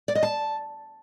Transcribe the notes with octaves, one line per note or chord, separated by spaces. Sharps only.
D5
D#5
A5